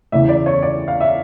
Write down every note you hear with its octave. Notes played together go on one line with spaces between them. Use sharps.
E2 C#3 E3 E5
D5
C#5
D5
F5
E5